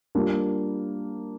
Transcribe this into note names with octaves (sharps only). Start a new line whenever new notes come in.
G3 A#3 D4 F4